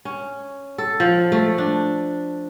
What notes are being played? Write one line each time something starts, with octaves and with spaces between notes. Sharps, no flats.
C#4
A4
F3
A3
D4